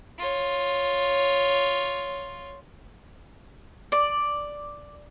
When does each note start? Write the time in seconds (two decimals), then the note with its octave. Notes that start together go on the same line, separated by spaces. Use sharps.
0.18 F4 C#5
3.92 D5